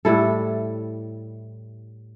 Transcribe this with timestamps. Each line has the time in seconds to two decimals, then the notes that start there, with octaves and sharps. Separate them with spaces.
0.05 A2 G3 E4 A4